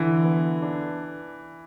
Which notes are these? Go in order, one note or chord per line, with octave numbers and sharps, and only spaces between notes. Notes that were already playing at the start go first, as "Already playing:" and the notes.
Already playing: D3 E3
B3
D4